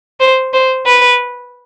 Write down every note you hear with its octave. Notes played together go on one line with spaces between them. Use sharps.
C5
C5
B4